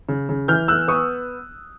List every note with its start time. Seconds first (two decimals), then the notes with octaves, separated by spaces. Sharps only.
0.09 C#3
0.29 C#3
0.48 E3 F6 G6
0.68 B3 E6 F#6
0.88 B3 C#6 D#6